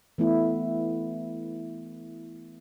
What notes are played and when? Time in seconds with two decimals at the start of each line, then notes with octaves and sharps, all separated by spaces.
0.18 E3 A3 B3 E4